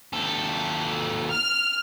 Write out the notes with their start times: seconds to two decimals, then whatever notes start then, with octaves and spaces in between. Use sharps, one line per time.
0.13 D#2 A4
1.29 F6